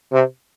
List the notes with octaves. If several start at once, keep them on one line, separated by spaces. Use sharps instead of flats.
C3